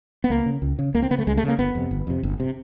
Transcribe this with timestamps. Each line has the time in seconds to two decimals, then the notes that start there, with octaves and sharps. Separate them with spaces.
0.24 B3
0.30 C#2 A#3
0.46 C#3
0.62 C#2
0.79 C#3
0.94 C#2 A#3
1.02 C4
1.10 C#3 B3
1.19 A3
1.27 C#2 G#3
1.37 A3
1.43 C#3
1.48 A#3
1.58 G1 B3
1.75 F2 C3
1.91 G1
2.07 F2 C3
2.23 G1
2.40 C3